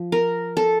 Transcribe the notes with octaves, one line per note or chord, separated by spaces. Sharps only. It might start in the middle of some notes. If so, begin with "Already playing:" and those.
Already playing: F3
A#4
A4